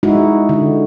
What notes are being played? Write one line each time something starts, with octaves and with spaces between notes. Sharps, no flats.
G#3 D#4 E4 F#4
D3